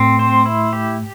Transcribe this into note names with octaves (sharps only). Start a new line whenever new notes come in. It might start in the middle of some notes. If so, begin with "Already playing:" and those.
Already playing: A2 C4
C5
E4
G4